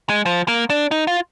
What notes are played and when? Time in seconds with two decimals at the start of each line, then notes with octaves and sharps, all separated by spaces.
0.09 G#3
0.25 F3
0.48 A#3
0.70 D4
0.91 D#4
1.07 F4